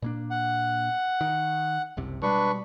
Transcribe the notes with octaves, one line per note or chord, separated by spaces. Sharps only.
A#2 A#3 D4
F#5
D#3
F#1 C2 C3
B2 G3 G#3 D4 B4 C#6